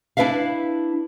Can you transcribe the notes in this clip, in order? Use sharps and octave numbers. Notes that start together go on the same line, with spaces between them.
D4 E4 B4 E5 F5